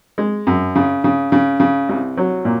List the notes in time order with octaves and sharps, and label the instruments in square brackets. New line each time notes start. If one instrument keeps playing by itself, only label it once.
[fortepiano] G#3
F#2
C#3
C#3
C#3
C#3
C2
F#3
A#2